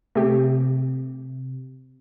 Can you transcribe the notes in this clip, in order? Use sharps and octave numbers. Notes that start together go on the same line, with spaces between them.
C3 A3 G4